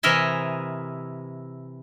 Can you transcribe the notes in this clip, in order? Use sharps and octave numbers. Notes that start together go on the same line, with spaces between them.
C3 E3 A#4 D#5 E5 G#5